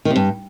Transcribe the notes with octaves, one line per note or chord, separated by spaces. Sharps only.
D#3
C3
G2